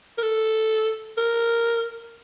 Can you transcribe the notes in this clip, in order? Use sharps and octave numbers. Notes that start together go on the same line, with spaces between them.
A#4
A4
A#4